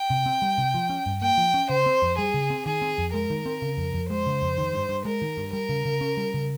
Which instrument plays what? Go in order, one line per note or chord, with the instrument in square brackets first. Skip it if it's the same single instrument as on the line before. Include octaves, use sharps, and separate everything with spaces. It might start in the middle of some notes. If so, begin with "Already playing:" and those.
Already playing: [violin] G5
[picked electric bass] C3
C4
G3
C3
F3
C#4
G2
[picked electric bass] A#3 [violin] G5
[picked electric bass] F3
C#4
[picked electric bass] C#3 [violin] C5
[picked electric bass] C4
F2
[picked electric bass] G3 [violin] G#4
[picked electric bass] C#3
C4
[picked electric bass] D#3 [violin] G#4
[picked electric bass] C4
F2
[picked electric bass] G#3 [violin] A#4
[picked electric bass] D#3
C4
C#3
F2
F2
[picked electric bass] G#3 [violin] C5
[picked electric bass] C#3
F2
D#3
G2
G2
[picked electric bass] G#3 [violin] A#4
[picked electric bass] D#3
G2
[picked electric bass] G3 [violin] A#4
[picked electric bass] C#3
C#3
C#4
G3
C#3